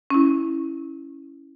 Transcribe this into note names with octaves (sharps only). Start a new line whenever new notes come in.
C#4 E4